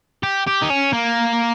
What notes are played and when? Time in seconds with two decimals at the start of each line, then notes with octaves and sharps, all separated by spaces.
0.23 G4
0.47 G4
0.62 D#4
0.70 C#4
0.93 A#3